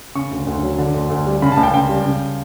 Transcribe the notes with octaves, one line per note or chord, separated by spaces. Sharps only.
C#3 C#6
D2
D2
F#3
D3
D2
D2
G3
C#3 B5
A5
C#2
G5
C#2 G5
G3
C#3